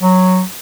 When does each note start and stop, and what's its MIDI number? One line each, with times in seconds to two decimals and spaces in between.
0.01 0.42 54